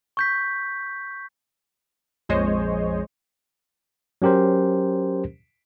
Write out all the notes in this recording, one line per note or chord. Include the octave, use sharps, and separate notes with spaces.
C#6 G6 B6
A#1 F2 G#3 C5 C#5 D#5
F#3 C#4 G4 A#4 C5